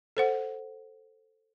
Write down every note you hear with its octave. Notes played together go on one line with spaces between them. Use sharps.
A4 C5 F#5